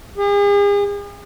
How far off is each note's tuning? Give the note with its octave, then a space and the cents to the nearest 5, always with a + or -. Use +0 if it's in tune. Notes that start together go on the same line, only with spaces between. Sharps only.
G#4 -40